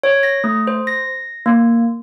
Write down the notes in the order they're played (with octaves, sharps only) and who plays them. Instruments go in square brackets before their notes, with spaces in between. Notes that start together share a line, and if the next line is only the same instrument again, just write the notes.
[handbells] C#5
A#6
A3
C5
A#6
A#3